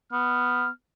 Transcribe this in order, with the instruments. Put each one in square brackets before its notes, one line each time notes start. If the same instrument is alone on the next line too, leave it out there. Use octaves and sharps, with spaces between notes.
[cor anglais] B3 [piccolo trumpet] F6